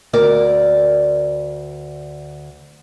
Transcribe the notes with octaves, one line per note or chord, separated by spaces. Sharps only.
D2 A#4 D5